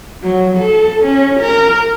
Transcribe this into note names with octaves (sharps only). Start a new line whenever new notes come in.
F#3
A4
C#4
A#4